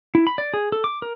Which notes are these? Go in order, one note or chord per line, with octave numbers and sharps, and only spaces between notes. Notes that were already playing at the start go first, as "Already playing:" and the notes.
E4
B5
D5
G#4
A4
D6
A#4